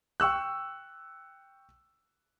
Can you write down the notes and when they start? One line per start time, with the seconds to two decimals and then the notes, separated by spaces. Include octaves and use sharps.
0.20 G5 C#6 E6 F#6